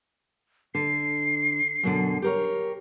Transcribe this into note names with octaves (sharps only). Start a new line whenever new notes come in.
D3 C7
F#2 B2 D3
G4 A#4 C#5